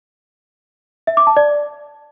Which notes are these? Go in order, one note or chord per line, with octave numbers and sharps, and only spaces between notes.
E5
D6
A5
D5